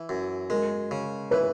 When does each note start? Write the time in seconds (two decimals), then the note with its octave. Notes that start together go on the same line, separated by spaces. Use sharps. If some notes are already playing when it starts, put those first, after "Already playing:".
Already playing: E3
0.09 F#2
0.50 G#3 A#4
0.91 C#3
1.31 E3 B4